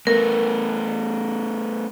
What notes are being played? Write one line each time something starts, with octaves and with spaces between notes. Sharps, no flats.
A3 B3 A#4